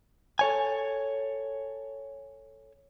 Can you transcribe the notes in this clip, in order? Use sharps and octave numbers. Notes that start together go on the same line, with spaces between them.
A4 C#5 G#5